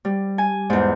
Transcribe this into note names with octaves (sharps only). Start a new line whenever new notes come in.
G3
G#5
E2 G#2